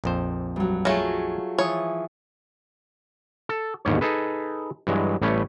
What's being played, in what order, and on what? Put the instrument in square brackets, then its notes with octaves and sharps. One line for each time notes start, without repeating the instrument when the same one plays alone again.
[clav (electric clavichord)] A#1 F2 C5
[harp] G2 F#3
[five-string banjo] F#3 A3 [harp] F4 G#4
[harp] E3 F3 D#6 [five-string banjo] C#5
[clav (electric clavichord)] A4
G1 D#2 G#2 G3 C#5
D#4 G#4 A4 B4
G2 E3 F#3 G#3
A1 G3 A3 C#4 B4 C#5